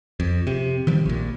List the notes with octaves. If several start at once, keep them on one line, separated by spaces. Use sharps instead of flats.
F2
C3
D#3 F3 G3
A#1 A#2